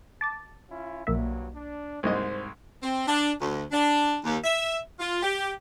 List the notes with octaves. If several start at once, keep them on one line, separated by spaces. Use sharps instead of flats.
A5 D6 A6
C#4 E4 F4
B1 G2 A#2 F#3 A#3 E5
D4
C2 G#2 C5 D#5
C4
D4
D2
D4
D#2
E5
F4
G4